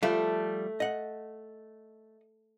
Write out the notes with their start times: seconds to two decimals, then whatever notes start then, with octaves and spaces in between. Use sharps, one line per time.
0.03 F3 G3 A3 F5
0.80 D#5 F#5